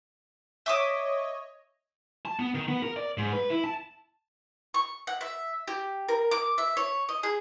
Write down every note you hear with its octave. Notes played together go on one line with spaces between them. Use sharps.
C#5 D#5 E5 D6 D#6
A5
B3
D#3
B3
A#4
D5
G#2
B4
E4
A5
C#6
F#5
E5
G4
A#4
D6
E5
C#5
D#5
G#4